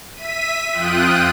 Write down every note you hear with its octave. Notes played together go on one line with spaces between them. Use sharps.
E5 B6 D#7
F2 F4 G5 D#6 F#6 D#7